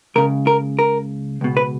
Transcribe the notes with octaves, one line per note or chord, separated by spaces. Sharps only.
C#2 C#3 A#4
A#4
A#4
C#2 B2
B4